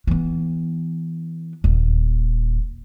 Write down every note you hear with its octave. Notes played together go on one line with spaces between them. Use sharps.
E3 B3
D#1